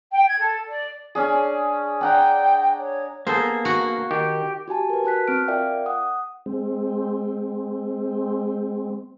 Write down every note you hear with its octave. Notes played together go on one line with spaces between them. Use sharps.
G5
G#6
A4
D5
C#4 D4 G#4
D4 F#5 G5 A#5
C#5
A#3 B3 G#4 A4 C5
F#4
D#3 G4
F#4 G4 G#5 A5
A#4 B4
F#4 A5 F#6 B6
C4 F6 D7
F4 A#4 D5 E5 F5 G5
F#5 D#6
G#3 C4